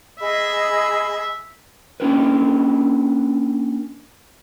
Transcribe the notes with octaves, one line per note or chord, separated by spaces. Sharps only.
G#4 D#5 E5 B5
A#3 C#4 D4 G4 A#4 B4